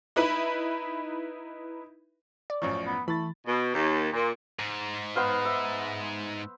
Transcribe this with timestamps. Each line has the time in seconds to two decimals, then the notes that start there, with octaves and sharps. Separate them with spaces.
0.16 D#4 E4 B4 B5
2.50 D5
2.62 A1 F#2 F3 C#5
2.87 B3
3.08 E3 A3 B5 A6
3.47 B2
3.74 D#2
4.13 A#2
4.60 G#2
5.16 B3 C5 F5
5.45 E5